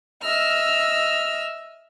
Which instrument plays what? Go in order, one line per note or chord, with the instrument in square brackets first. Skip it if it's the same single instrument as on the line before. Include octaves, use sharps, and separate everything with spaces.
[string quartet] D#5 E5 E6 F6